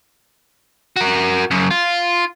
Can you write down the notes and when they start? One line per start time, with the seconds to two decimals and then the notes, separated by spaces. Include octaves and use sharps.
0.96 F#4 A#4
1.51 F#2 C#3
1.71 F4